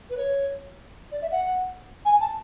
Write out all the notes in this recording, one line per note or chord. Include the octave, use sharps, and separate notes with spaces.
B4
C#5
D5
E5
F#5
G#5
A5